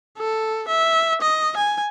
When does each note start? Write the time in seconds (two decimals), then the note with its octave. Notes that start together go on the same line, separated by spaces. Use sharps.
0.18 A4
0.68 E5
1.21 D#5
1.57 G#5